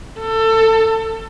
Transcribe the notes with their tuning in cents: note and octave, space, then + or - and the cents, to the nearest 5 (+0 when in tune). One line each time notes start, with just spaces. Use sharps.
A4 +25